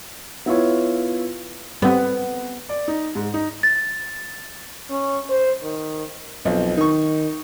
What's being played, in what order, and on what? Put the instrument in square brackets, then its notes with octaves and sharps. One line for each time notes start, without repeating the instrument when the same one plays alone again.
[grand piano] B3 E4 F4 C#5
[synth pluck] G3 C4 [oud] B3
[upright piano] D5
D#4
G#2
D#4
[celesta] A6
[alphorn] C#4
C5
D#3
[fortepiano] B1 [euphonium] F2
[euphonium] D#3 [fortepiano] D#4 C#6